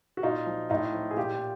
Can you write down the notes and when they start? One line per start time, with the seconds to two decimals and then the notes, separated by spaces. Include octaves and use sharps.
0.17 F#4
0.23 A#2 D#4 F4
0.46 F3
0.70 A2 D#4 F4
0.94 F3
1.11 G#4
1.17 A#2 F4 G4